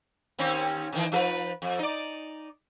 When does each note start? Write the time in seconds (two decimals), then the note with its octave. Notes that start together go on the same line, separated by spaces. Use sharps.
0.39 D#2 C4 C#4
0.93 C3 D#3 E3
1.12 F3 A4 B4
1.62 F2
1.79 D#4 D5